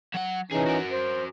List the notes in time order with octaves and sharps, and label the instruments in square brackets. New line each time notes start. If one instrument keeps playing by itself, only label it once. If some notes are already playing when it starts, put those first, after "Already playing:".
[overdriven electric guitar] F#3 F#5
[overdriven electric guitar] C3 G#4 [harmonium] E3 C#4 D#4
[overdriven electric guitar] F#4 A#4
[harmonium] C5